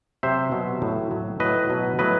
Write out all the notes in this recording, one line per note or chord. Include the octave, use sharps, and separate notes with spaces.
C3 F#3 C5 E5
B2 F#3
A2 F#3
A2 F#3
A2 F#3 B4 D#5
B2 F#3
A2 F#3 B4 D#5